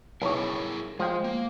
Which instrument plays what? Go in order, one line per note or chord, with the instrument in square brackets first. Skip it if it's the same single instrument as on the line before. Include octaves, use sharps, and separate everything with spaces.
[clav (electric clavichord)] B1 C#5 [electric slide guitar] E4 G#4 A#4
[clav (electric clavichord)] F3 G5 [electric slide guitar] G#3
[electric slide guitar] A#3